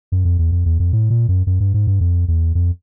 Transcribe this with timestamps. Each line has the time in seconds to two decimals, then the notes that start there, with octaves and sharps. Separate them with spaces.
0.12 F#2
0.25 F2
0.39 E2
0.52 F2
0.66 E2
0.80 F2
0.93 A2
1.10 A#2
1.28 F#2
1.47 F#2
1.60 G2
1.74 G#2
1.87 G2
2.01 F2
2.28 E2
2.55 F2